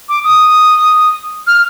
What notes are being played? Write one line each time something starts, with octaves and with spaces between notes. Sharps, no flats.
D6
D#6
F6